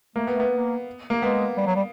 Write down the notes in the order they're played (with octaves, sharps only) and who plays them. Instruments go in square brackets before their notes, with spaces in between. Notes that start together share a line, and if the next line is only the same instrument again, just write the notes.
[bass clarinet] A3 [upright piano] A#3
[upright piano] B3
[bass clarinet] A3
[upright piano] B3
[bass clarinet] A#3
[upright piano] A#3
[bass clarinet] G#3 [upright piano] B3
[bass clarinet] G3
F#3
G3